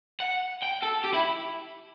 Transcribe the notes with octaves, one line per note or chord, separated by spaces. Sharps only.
F#5
G5
A4
G4
E4